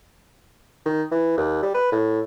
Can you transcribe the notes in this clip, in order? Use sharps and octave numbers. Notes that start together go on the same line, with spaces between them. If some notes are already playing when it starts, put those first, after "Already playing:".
D#3
E3
D#2
G3
B4
A2